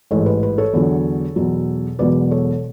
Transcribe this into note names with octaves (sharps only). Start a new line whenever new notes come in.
A1 G#2 E3 A4 C#5
B4
B4
A4 C#5
E2 D3 F#3
E2 B2 F#3
E1 E2 B2 F#3 B4 D5
A4 C#5